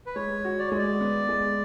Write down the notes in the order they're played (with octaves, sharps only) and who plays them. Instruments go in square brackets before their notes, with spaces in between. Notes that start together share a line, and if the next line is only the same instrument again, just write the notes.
[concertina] B4
[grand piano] G#3 [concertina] C#5
[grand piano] F#4
[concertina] D5
[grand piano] G#3 [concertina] C#5
[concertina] D5
[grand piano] B3
G#3